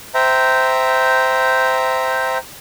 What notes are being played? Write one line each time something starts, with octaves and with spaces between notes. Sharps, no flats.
C5 E5 G5 A#5